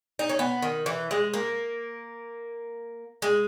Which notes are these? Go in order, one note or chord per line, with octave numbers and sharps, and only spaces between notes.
D#4
C#4
B3
D#3
E3
G#3
A#3
G#3